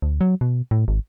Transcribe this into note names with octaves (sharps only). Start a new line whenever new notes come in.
D2
F#3
B2
A2
G#1